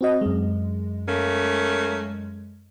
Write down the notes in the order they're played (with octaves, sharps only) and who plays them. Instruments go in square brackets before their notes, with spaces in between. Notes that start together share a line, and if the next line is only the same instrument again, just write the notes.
[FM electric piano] C4 F#4 D#5
F#2 G#3
[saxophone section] A3 A#3 C#4